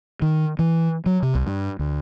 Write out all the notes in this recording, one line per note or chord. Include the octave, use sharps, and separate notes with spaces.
D#3
E3
F#3
C3
C2
G2
D2